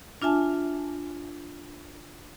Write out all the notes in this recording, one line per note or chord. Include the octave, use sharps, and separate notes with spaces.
D4 F4 E5 G#5 A5